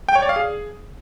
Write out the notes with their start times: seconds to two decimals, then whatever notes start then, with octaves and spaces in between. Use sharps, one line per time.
0.09 G5
0.15 C#5
0.22 D5
0.29 F5
0.36 G#4